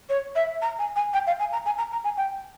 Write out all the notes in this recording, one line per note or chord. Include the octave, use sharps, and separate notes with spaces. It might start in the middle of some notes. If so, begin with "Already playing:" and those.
C#5
E5
A#5
G#5
G#5
G5
F5
G#5
A#5
G#5
A#5
A#5
G#5
G5